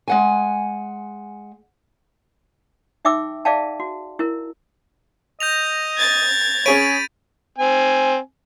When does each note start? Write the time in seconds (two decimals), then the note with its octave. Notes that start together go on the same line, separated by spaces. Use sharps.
0.08 G#3 F#5 G#5
3.05 D#4 E5 G5 D6 E6
3.45 G#4 D5 E5 F5 G5 A5
3.80 F#4
4.19 E4 A#4
5.40 D#5 G6 A#6 F7
5.97 G#6 A6
6.66 C#4 G#4 C#5 B5 A6 D7 D#7
7.58 C4 G#5